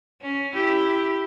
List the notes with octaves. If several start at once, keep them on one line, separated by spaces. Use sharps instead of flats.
C#4
E4 G4